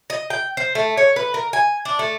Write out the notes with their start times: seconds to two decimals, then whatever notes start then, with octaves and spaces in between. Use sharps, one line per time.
0.10 D#5
0.30 G5
0.57 C5
0.75 A3
0.97 C#5
1.16 B4
1.34 A#4
1.53 G#5
1.85 D4
1.99 A3